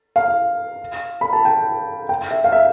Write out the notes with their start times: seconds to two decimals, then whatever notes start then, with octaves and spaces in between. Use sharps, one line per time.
0.16 F5
1.21 B5
1.33 A5
1.45 G5
2.09 G5
2.31 E5
2.44 F5
2.52 E5